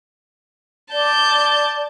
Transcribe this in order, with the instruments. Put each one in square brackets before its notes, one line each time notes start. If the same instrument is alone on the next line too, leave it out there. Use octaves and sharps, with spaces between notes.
[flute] D5 [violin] A5 G6